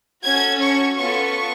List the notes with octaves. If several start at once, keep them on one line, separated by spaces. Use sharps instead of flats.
C#4 F#4 A4 G#6
C#6
B3 F4 A4 C#6